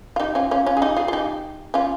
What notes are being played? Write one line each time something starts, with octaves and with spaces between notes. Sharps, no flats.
F4
D#4 G4
C#4 F4
C#4 F4
C#4 F4
G#4
D#4 G4
F4 G#4
F4
D#4 G4
C#4 F4